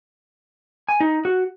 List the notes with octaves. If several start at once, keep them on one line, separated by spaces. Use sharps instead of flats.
G#5
D#4
F#4